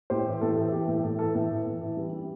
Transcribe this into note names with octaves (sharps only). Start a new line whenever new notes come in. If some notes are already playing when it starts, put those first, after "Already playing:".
A2 G4 C5
E3
A2 A4
G4
E3 A4
E3 G4
A2
A2 A4
E3 A4
A2
E3
A2
E3
G3
G3